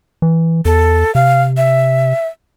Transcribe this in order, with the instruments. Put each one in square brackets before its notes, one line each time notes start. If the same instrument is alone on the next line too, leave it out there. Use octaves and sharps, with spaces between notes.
[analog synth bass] E3
[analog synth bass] E2 [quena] A4
[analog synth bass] C3 [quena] F5
[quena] E5